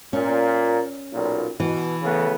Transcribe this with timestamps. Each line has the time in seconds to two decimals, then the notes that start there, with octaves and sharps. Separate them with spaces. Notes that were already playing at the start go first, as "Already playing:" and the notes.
0.13 A#2 C#4
1.12 B1 A#2
1.60 B2 E3
2.03 C#3 A3 B3